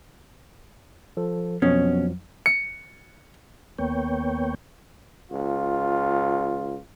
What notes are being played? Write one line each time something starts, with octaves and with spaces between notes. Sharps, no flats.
F3 A4
F2 B2 F3 F#3 C#4
C#7
D#2 A#3 B3 C#5 G5
C#2 F4